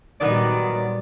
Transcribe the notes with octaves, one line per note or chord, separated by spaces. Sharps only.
A#2 D#3 F#3 G3 B3 D#4 D5